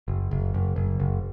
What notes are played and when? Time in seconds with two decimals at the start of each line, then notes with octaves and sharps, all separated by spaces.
0.08 F#1
0.31 F#1
0.54 F#1
0.76 F#1
1.00 F#1